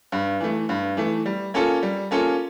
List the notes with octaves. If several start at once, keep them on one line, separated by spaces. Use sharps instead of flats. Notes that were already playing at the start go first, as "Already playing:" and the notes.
G2
E3 A3
G2
E3 A3
G3
A#3 C#4 F4 A4
G3
A#3 C#4 F4 A4